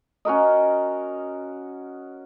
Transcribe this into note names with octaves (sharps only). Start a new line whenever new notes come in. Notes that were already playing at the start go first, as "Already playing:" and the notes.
C#4 F#4 A#4 D#5